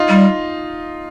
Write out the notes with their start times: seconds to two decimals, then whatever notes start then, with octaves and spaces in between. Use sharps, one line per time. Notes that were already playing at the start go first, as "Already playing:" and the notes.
Already playing: D#4 F4
0.09 G3